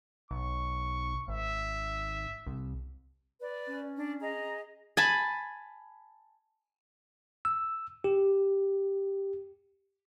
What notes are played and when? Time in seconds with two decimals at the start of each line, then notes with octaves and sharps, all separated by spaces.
0.31 B1 C#6
1.28 G#1 E5
2.47 C2
3.41 B4 D5
3.67 C#4
3.95 D4
4.20 G#4 D#5 A#5
4.97 G#5 A5 B5
7.45 E6
8.04 G4